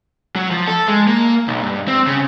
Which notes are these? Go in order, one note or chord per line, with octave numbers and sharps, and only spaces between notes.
F#3
F3
A4
G#3
A#3
B1
G2
C4
C#3